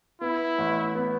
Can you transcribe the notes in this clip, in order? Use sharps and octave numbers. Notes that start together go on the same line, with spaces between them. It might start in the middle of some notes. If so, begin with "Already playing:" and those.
B3 E4
A1
B3